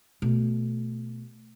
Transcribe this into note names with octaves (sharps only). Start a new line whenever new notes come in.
B2 A3